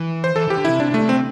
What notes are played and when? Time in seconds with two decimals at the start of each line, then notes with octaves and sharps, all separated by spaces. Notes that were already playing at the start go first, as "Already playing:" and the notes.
Already playing: E3
0.24 C5
0.36 E3 A4
0.47 E3 G4
0.57 D3
0.65 C3 E4
0.80 C3 D4
0.91 C3
0.94 A3
1.01 C3
1.09 C4
1.13 C3